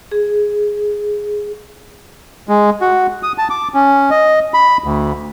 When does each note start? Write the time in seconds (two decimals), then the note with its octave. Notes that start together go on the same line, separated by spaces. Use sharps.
0.11 G#4
2.49 G#3
2.81 F#4
3.23 D#6
3.38 A5
3.50 D6
3.74 C#4
4.10 D#5
4.54 B5
4.84 D2